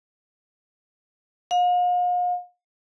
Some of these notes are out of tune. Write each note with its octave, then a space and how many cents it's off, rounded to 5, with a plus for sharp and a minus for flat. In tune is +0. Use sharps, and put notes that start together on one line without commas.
F5 +40